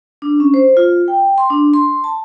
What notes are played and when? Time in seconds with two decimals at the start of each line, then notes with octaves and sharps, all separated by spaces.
0.22 D4
0.40 C#4
0.54 C5
0.77 F4
1.08 G5
1.38 C6
1.50 D4
1.74 C6
2.04 A5